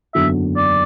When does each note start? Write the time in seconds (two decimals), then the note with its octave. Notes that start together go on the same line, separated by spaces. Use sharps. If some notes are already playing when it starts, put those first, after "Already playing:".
0.15 F#1 E2 D3 F#3 E5
0.56 D5